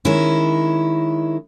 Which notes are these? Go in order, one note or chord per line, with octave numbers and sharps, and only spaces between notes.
D#3 G#3 C#4 E4